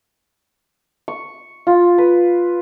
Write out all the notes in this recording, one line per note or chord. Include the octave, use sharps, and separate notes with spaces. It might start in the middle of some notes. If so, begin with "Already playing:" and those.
C#6
F4
B4